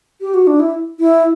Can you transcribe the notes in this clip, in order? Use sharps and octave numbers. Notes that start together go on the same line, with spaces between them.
G4
F#4
D4
E4
E4